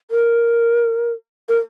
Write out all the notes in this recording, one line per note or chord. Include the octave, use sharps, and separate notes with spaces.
A#4
A#4